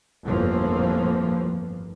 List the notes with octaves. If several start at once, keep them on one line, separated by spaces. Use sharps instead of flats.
G1 F2 A2 E3 F3 A#3